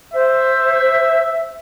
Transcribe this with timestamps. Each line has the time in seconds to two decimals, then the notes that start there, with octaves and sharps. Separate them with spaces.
0.14 C5 E5